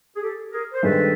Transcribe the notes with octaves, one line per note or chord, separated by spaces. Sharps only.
G#4
G4 A4
G#4 A#4
C5
G2 D#3 G#3 A4 B4